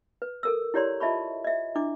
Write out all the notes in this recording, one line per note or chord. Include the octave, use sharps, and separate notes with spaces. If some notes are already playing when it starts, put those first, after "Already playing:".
B4
A4 A#4 E6
E4 G4 C#5 D5 A#5 C6
F4 D#5 E5 A5 B5 C#6
D#5 E5
D4 E4 D6